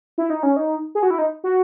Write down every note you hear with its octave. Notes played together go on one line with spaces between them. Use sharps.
E4
D#4
C#4
D#4
G#4
F#4
E4
D#4
F#4